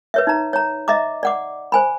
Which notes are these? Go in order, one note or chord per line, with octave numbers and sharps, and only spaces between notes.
B4 C#5 E5
D#4 A#5
C#5 A#5
D#5 E5 A#5 D6
D5 F#5 D6
C5 G#5 B5